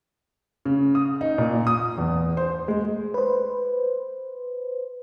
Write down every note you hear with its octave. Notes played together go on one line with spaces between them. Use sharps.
C#3
D#6
D#4
A#2
D#6
E2
C5
G#3
B4 C5